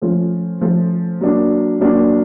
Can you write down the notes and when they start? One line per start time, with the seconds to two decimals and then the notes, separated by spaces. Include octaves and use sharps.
0.02 F3 A3 C#4 F4
0.61 F3 A3 C#4 F4
1.21 F#3 A#3 D4
1.80 F#3 A#3 D4